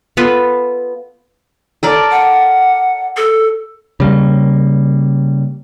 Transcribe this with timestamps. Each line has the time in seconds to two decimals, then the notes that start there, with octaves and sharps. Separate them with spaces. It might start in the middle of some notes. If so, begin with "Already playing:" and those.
0.17 B3 F4 A4 B4
1.83 A4 A#4 D5
2.11 F#5
3.17 A4
4.00 C#3 G3 A#3